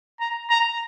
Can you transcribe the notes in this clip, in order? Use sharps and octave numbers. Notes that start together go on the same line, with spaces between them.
A#5
A#5